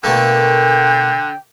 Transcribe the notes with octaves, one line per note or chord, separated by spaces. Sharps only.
B2 D3 A3 A#3 G5